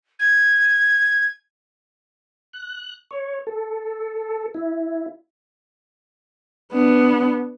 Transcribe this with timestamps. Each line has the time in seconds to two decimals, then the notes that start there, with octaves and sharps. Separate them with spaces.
0.19 G#6
2.53 F#6
3.11 C#5
3.47 A4
4.54 E4
6.73 B3 D4